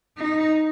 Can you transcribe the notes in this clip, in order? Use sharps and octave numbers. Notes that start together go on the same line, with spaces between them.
D#4